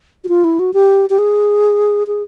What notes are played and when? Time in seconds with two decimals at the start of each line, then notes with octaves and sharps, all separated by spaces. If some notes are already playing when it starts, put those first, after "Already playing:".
0.24 F#4
0.28 F4
0.44 E4
0.59 F#4
0.74 G4
1.10 G4
1.18 G#4
2.07 G#4